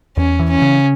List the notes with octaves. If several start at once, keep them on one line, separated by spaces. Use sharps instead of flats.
E2 C#4
E3
C#4
C#3